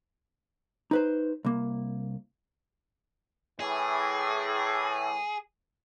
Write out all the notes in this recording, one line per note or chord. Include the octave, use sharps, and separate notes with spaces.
D#4 B4 C5
C2 A#3
A2 E3 G#4